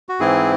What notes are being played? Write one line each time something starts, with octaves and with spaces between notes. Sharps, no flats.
F#4
G#2 E3 C4 E4 G#4